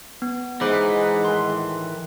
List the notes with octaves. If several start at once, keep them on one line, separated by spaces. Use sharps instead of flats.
B3
E3 G#3 D#4 C5 F#5 B5 D6
A2 D#3 C6